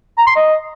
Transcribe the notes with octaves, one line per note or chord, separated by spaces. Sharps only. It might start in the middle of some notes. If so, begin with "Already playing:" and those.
A#5
C6
D#5